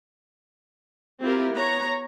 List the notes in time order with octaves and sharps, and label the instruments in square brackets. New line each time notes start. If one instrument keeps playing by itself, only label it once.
[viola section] C4 E4 F4 G4 A#4
B3 C#5 A#5